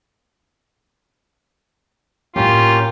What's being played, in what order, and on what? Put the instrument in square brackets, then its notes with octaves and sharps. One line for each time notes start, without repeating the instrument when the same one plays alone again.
[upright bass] A2 D#4 [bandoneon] A#3 C#4 G4 [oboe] F4